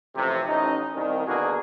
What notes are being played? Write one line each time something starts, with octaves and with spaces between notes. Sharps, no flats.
A1 F2 C3
A1 C#4 D#4
C2 D#3
B2 D3 A#3 F#4 G#4